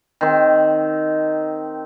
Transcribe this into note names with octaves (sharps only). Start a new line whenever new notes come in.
D#3 C4